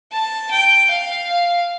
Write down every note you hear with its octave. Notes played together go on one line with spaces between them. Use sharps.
A5
G5
F5